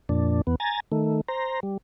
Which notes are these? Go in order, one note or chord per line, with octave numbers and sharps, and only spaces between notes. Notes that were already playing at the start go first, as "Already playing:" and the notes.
F2 A#2 D4
E2 B3
G#5 A#5 A6
D#3 A3
C5 A#5
G3